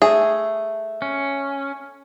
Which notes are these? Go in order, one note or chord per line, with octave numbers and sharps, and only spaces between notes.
A3 G#4 E5
C#4